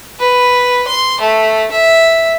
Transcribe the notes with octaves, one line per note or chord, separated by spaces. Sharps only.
B4
C6
A3
E5